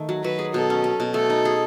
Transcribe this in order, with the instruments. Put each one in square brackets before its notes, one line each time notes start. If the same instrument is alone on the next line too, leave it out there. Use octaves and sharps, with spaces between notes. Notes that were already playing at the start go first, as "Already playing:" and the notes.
Already playing: [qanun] D#3 A3
F#3
[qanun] F#3 [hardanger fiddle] B4
[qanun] G#4
[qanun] B2 [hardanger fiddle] A4
[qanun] C#4
C#4
B2
[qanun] A3 [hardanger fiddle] A4
[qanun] D#4
G#4